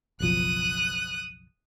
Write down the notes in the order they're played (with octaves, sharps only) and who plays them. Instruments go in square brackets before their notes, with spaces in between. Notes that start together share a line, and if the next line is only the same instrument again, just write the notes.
[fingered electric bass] F#1 B1 F3 [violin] D#6 F#6